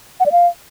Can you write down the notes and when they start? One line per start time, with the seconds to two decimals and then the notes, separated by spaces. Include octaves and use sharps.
0.20 F#5
0.26 D5
0.32 F5